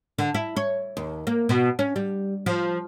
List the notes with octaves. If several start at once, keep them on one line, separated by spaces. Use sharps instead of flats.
D3
E4
C#5
D#2
A#3
B2
C#4
G3
F3